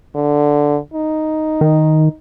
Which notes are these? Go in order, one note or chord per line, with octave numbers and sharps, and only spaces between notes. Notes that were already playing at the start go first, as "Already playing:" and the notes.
D3
D#4
D#3